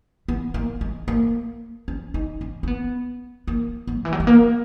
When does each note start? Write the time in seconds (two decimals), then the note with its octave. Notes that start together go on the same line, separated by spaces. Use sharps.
0.28 B3
0.54 A#3
0.81 G#3
1.08 A#3
1.88 C#4
2.14 D#4
2.41 C#4
2.63 C#4
2.67 B3
3.48 A#3
3.87 B3
3.98 D#3
4.05 E3
4.13 F#3
4.20 G#3
4.27 A#3